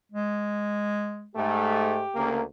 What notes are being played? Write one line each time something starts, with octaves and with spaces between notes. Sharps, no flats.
G#3
G#2 A3 G4
D2 C#3 A#3